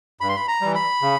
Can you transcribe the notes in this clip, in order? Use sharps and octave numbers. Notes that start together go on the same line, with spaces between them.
G2 B5
C6
B5
A#5
E3 G3
B5
C#3